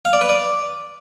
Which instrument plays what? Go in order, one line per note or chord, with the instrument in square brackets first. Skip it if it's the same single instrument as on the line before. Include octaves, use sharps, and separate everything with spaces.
[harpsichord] F5
D5
B4
D5